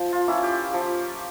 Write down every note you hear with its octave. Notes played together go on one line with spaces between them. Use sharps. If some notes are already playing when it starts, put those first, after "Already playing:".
Already playing: F3
F4
A#3 C#4 E4
G4
F3 G4